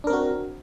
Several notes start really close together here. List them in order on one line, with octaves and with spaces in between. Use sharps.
D4 A#4 C4 F#4